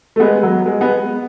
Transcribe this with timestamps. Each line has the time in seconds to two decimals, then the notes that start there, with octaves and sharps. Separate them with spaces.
0.16 A3
0.20 G#3 B3
0.43 F#3
0.66 G#3
0.81 G#3 B3